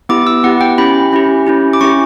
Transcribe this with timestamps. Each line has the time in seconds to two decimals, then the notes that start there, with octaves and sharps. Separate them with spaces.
0.09 B3 E4 G4 D6
0.27 E6
0.44 B3 E4 G4 F#5
0.61 G5
0.78 C#4 E4 G4 B5
1.13 C#4 E4 G4
1.47 C#4 E4 G4
1.73 D6
1.81 C#4 E4 G4 C#6